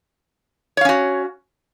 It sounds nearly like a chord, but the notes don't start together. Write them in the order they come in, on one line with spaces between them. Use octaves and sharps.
C#5 F5 C#4 F#4